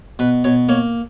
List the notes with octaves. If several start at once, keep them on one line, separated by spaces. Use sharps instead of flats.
B2 B4
B2 C#5
A#3 C#5